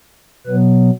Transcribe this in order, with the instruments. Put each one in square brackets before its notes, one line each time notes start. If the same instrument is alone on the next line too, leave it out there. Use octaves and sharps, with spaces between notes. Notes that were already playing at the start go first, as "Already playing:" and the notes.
[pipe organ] B2 F#3 B3 B4